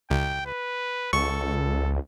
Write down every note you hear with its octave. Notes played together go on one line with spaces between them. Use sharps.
C#2 G5
B4
C#2 A4 C#6